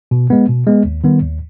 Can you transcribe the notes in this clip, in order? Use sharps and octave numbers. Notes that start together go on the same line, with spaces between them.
B2
G#3 B3
B2
G#3 B3
D#2
D#3 G3 B3
D#2